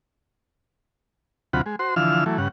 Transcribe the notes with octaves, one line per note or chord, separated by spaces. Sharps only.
D2 C3 F#3 F4 F#5 B5
G#3
F#4 C5 C6
D3 E3 F3 F5 E6 F6
E3 F#3 A3
G2 C#3 F#5